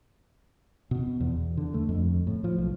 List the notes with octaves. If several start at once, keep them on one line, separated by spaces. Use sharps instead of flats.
B2
E2
D3
A3
F2
A2
F3
B1